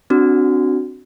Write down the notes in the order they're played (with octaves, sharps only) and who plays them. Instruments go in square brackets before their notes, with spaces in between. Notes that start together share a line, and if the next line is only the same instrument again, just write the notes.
[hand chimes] C4 D4 F#4